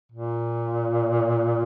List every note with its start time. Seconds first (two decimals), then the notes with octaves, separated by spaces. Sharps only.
0.12 A#2